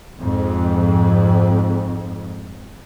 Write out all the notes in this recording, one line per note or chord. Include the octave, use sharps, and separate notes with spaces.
F2 G#2